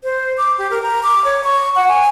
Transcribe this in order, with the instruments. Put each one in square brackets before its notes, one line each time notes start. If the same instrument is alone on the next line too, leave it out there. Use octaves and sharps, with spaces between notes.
[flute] C5
D6
G4
A#4
A#5
D6
C#5
C#6
F#5
G#5